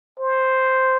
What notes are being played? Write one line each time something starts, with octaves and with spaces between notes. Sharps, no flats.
C5